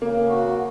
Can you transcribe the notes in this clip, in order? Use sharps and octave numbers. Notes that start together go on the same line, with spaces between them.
C#3 A#3
F#4